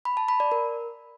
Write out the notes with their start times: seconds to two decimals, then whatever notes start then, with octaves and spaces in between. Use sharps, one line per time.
0.05 B5
0.17 A5
0.28 B5
0.40 D5
0.52 A#4